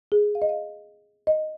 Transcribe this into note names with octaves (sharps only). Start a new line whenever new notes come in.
G#4
F5
D#5
F5
D#5